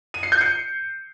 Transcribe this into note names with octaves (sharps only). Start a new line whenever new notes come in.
D#7
C7
G6
C#7